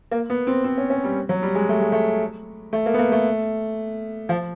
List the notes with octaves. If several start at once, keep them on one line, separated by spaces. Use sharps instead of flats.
A#3
B3
C4
C4
C#4
C#4
G3
F#3
G3
G#3
A3
G#3
A3
A3
A#3
B3
A#3
A3
F3